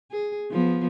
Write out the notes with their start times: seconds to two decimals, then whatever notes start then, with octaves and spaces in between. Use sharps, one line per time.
0.11 G#4
0.51 F3 B3